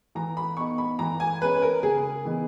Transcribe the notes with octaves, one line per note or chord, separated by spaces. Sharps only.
E3 A#5
B5
B3 D#4 C#6
B5
E3 A#5
G#5
G#3 C#4 B4
A#4
C#3 G#4
E3 B3 D#4